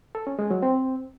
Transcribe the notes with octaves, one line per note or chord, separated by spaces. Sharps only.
A4
C#4
G#3
F#3
C4